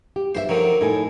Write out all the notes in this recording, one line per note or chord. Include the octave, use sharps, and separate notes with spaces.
G4
G2 G4 C5 E5
D3 D#3 F3 F#3
A2 D#4 A4 G#5